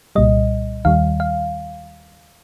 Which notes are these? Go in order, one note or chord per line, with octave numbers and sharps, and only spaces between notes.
C2 A#2 G3 D#5
D#2 D#3 G3 F5
F5